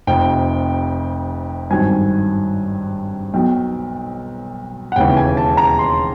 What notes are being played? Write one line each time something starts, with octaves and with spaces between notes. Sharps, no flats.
F1 F2 C3 G5
G#1 G2 D#3 F#3 G#5
B1 B2 F#3 G5
F#5
E1 D#2 C#3 E3 G5
G#5
A5
A#5
C6